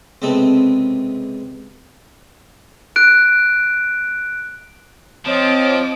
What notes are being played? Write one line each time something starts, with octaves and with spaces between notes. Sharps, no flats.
C#2 C3 G#3 B3 C4 A4
F#6 D7
F3 C4 C#5 D#5 D6